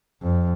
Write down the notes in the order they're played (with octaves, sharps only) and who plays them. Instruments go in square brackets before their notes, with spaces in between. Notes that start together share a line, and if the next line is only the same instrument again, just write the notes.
[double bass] F2